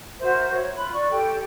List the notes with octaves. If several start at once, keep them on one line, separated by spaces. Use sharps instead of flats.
F#4 A#4 C5 E5
C#5 E5
F4 B5 F#6
D5 C#6
G4 A4 G5